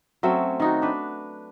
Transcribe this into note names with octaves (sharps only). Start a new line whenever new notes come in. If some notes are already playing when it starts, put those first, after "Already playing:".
F#3 A3 C4 C#4
D#3 D#4 F#4
D4 B4